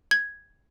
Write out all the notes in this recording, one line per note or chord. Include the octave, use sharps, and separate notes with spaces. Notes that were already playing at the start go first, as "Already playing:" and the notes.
G#6